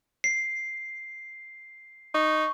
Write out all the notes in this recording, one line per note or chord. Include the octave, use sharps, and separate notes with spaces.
C7
D#4 C#6